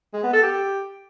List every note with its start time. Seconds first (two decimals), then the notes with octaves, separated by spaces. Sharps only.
0.14 G#3
0.23 B3
0.33 A4
0.43 G4